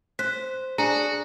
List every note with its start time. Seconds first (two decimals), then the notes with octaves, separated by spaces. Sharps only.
0.19 C5 F#6 B6
0.78 D4 F#4 G#4 A#5